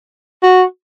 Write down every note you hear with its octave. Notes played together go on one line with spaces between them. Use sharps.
F#4